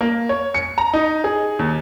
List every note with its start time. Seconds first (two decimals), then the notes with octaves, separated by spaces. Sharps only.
0.01 A#3
0.29 C#5
0.54 C#7
0.78 A#5
0.93 D#4
1.24 G#4
1.59 D#2